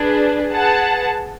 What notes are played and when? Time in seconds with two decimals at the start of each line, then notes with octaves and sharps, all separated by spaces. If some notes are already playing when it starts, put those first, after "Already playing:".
Already playing: D4 G#4 B4
0.53 G#4 B4 F#5 A5